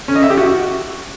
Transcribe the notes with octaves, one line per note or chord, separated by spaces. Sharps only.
C#4
D#5
E5
G4
F#4